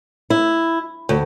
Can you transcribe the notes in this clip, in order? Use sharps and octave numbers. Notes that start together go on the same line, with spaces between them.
E4
D2